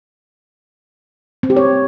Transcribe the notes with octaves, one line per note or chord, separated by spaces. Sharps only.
C4
G4
C#5